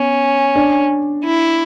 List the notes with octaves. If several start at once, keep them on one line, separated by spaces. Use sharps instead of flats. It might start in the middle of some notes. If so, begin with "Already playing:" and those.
Already playing: B3 C#4
D4
E4